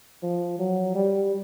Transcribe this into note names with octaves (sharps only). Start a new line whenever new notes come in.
F3
F#3
G3